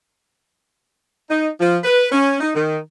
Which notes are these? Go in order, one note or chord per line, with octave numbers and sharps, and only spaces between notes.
D#4
F3
B4
C#4
D#4
D#3